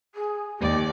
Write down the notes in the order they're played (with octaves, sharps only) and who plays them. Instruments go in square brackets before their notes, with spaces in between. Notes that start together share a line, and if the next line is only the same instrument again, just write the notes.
[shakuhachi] G#4
[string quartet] D#2 D5 D6 [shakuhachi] G4